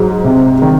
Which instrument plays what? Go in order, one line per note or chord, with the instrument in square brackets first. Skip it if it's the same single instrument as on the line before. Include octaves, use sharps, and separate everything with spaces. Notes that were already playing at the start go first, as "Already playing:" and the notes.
Already playing: [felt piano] G#2 [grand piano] F#3
[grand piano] C3
D#3